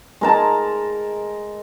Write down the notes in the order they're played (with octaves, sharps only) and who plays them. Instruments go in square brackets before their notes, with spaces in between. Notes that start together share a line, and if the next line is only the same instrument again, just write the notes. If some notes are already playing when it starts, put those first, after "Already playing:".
[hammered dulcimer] G#3 A#4 A5